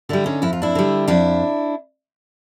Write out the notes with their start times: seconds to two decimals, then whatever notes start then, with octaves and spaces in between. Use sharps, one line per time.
0.09 D3 G3 D4 E4
0.26 C#4 D#4
0.42 F2 E4
0.53 F4
0.62 D4 E4
0.75 D3 G3
1.08 F2 D4 E4